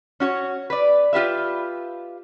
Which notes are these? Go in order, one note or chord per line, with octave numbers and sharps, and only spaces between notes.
C#4 F#4 C#5
B4 D5
F4 G4 B4 E5